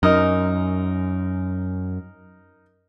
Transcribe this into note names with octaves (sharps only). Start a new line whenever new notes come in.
F#2 D#4 A#4 D#5